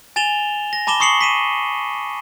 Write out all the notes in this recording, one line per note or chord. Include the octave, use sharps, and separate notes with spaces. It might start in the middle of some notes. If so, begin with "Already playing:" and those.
G#5 A6 E7 F7 G7
A#6
A5 B5 D6 E7 G7
C#6 D#6 C7 C#7 F#7 G7
B6 D#7 E7